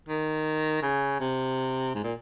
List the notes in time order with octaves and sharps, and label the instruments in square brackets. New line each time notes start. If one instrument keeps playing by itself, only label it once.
[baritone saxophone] D#3
C#3
C3
G#2
A#2